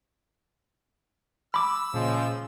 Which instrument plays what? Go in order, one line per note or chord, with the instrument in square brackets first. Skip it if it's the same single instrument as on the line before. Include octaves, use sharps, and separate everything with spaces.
[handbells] B5 D6 [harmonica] E6
[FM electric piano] A#2 [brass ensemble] C#3 F3 G#3